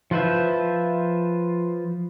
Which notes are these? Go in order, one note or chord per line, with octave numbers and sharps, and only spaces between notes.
F3 F4 B4 C5 E5